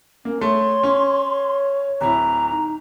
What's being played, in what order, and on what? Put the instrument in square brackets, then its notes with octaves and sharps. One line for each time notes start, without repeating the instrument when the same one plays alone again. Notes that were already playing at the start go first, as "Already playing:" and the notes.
[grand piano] A#3 [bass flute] C#4
[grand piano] A3 [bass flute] C#5 [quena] C6
[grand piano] C#4
[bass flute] C#5
[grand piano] D1 E4 [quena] A#5
[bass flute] D#4